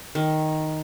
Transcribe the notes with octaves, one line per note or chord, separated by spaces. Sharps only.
D#3